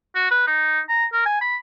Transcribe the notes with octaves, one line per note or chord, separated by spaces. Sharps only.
F#4
B4
D#4
A#5
A#4
G#5
B5